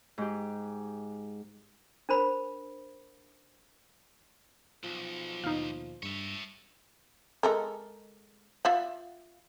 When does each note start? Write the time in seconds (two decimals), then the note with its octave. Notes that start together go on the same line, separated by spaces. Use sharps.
0.18 G#2 G4
2.09 D4 A#4 C5 B5
4.83 B1 F3
5.44 D#2 B2 D#4 F5
6.03 G2 C#5 E5
7.43 G#3 A4 A#4
8.65 F4 E5 F#5